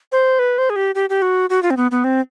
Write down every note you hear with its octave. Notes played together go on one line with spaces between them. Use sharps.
C5
B4
C5
G#4
G4
G4
G4
F#4
F#4
F4
C4
B3
B3
C4